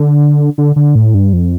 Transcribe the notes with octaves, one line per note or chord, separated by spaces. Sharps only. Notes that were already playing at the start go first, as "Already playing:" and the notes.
Already playing: D3
D3
D3
A2
G2
F2